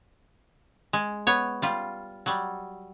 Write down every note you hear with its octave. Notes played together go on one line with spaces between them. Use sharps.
G#3
B3 C#5
G3 F4
F#3 G3